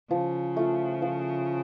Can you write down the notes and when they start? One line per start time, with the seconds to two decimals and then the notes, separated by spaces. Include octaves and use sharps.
0.11 C#3 F3
0.57 A3 F4
1.02 F3